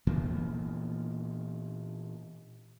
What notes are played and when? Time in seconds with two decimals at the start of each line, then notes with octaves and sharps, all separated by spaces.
0.07 A#2 E3 A#3 B3